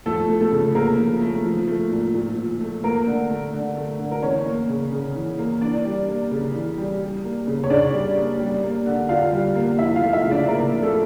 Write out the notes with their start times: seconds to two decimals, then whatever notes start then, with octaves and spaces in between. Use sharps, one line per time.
0.06 F3 A3 A4
0.29 A3
0.41 A3 A4
0.52 C#3
0.75 C#3 A#3 A#4
0.99 F3
1.21 A3
1.45 F3
1.68 A3
1.91 A#2
2.14 A#2
2.37 F3
2.60 A3
2.84 A3 A#3 A#4
3.07 D3
3.30 A3
3.53 D3
3.77 A3
3.99 D3
4.11 A#4
4.22 E3 C#4 C#5
4.46 A#3
4.69 C#3
4.92 C#3
5.15 E3
5.39 A#3
5.61 E3 D4 D5
5.85 G3
6.08 A#3
6.31 C#3
6.55 E3
6.78 G3
7.00 G3
7.24 A#3
7.47 C#3
7.63 C#5
7.70 C#3 D4 D5
7.93 G3
8.16 A#3
8.40 G3
8.63 A#3
8.86 D3
9.09 D3 F4 F5
9.32 G3
9.56 A#3
9.78 F3 E4 E5
9.96 F4 F5
10.02 A3
10.13 E4 E5
10.25 C#3
10.31 D4 D5
10.48 C#3 A#3 A#4
10.71 F3
10.83 A3 A4